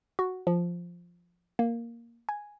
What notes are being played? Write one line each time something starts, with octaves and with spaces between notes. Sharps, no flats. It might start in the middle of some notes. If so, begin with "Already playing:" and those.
F#4
F3
A#3
G#5